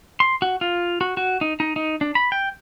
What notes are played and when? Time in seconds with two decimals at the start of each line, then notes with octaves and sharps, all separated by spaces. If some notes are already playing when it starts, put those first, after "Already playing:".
0.20 C6
0.42 F#4
0.61 F4
1.01 F#4
1.17 F#4
1.41 D#4
1.60 D#4
1.76 D#4
2.01 D4
2.15 B5
2.32 G5